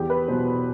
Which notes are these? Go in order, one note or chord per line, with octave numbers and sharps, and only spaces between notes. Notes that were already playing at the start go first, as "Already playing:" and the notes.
Already playing: E2 G4
B4
B2 F#3 C5